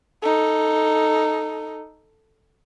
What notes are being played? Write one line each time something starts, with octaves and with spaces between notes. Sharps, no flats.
D#4 A4